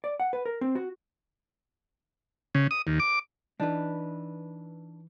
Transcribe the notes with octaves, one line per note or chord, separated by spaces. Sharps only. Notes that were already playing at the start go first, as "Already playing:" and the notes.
D5
F#5
B4
A#4
C4
F#4
C#3
D#6
D#2
D6
E3 D4 D#4 B4